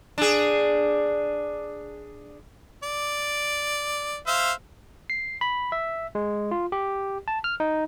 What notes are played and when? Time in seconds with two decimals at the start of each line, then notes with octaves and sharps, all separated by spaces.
0.18 D4 G#4
2.83 D5
4.27 C5 E5 F5
5.10 C7
5.41 B5
5.72 E5
6.15 G#3
6.51 F4
6.72 G4
7.28 A5
7.44 F6
7.60 D#4